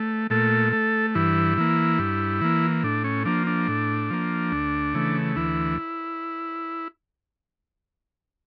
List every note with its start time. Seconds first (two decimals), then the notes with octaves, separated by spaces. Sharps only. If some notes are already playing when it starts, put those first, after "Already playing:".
Already playing: A3
0.30 A#2 A3 A4
0.73 A3
1.15 G2 E3 E4
1.58 E3 A#3
1.99 G2
2.41 E3 A#3
2.83 A2 D4
3.04 C#4
3.25 F3 A#3 D4
3.47 D4
3.68 A2
4.10 F3 A#3
4.52 D2
4.94 C#3 E3 A3
5.36 D2 E3 E4